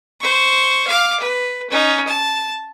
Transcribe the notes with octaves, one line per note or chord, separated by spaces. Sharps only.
C5 C#6
F5 D6
B4
C#4 D#4
A5